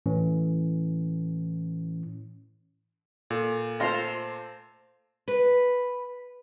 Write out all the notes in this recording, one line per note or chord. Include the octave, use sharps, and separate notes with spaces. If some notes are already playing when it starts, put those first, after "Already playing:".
A2 E3 C#4
A#2 A4
A3 F4 A4 C5 A#6 C7 F7
B4